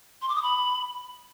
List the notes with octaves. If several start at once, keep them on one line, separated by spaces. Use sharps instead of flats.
C6
D6
D#6
B5